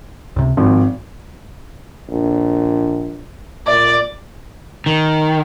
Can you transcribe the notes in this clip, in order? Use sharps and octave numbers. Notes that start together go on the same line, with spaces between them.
C#2 C3
G#1 F3
A#1
A#2 D5
D#3